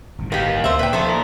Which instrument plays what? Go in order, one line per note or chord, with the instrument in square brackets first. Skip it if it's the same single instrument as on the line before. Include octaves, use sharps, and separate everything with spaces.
[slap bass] G1 A2 D#3
[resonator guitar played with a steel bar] B3 G4 [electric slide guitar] A#4 D#5 F5
[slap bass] D2 D3 D#3 [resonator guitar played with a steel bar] C5 E5
[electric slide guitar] A#2 [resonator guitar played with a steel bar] B4 G5
[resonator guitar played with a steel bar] D#3 A4 C5 [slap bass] F3 [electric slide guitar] E5 F5
[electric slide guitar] A#2 A#4